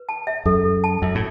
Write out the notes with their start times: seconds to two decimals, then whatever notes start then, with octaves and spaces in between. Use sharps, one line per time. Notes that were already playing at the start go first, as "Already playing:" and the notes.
Already playing: B4
0.09 A5
0.27 E5
0.46 F#2 A4
0.65 A4
0.84 A5
1.02 F#2 E5
1.15 A2